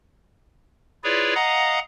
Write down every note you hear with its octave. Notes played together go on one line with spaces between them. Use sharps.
E4 F4 G#4 B4 C#5 D5
D#5 F5 F#5 A#5 D#6